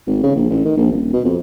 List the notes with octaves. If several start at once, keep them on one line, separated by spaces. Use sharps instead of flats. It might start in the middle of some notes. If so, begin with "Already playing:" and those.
G#1
C#3
A#1
A1
D#3
A#1
D#1
B2
F2